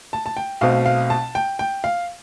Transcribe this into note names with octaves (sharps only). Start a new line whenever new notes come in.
A5
A5
G5
B1 B2 A3 C4 F5
F5
A5
G5
G5
F5